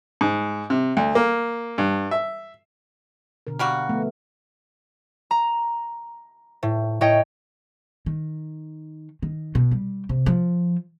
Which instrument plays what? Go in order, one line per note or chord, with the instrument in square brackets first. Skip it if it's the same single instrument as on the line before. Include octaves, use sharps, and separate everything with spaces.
[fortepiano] G#2
C3
D2
A#3
G2
E5
[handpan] B2 D3 A#4
[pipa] G3 A#3 F#4
[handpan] F3 A3 B3
[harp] A#5
A2
A2 C#5 D#5 G5
[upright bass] D#3
D#3
B2
G3
C3
F3